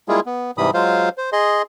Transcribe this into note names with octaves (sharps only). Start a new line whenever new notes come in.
G3 G#3 A#3 E4 F4 G#4
B3
G#2 C3 E3 G3 B5 D#6
F#3 G#3 F4 C5 F5
C5
G#4 D#5 C6